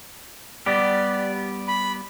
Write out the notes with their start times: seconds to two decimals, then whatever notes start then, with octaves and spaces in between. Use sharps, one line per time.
0.66 G3 B3 G4 D5
1.68 B5